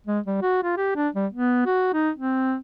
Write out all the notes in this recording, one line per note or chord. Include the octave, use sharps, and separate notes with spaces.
G#3
G3
F#4
F4
G4
D4
G3
B3
F#4
D#4
C4